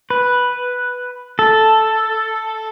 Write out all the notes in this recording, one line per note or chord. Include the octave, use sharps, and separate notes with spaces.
B4
A4